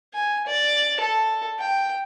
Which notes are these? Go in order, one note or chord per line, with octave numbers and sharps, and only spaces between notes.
G#5
D5
A4
G5